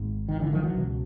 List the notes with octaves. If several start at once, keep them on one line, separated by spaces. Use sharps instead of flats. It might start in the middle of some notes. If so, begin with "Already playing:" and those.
Already playing: G#1 G#2
D#3
D3 E3
D#3 F3
E3 F#3
C#2 B2